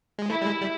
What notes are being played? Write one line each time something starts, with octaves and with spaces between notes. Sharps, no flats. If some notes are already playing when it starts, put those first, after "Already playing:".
G#3
A3 E4
G3
G#3
G3